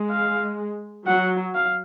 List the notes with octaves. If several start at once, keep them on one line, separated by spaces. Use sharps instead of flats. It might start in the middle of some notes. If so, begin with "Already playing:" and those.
Already playing: G#3
F5
F#3 F#5
F5